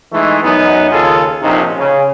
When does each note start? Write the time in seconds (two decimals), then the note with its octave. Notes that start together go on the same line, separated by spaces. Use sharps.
0.12 E3 G#3 A3 D#4
0.43 F#2 B3 D#4
0.91 D#2 C#3 F4 G#4 A4
1.42 A#1 C3 C#4 D#4
1.78 C#3